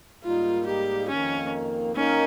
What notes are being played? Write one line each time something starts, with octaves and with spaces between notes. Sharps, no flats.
G#2 G3 A#3 D#4 F4
G4
F2 D#3 A#3 C#4
D#3 A#3 C#4 D#4 A#4